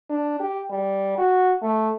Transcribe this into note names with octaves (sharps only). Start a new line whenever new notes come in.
D4
G4
G3
F#4
A3